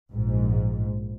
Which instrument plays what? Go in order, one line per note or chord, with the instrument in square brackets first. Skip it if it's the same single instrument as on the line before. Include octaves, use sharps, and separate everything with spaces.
[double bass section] A#1 G#2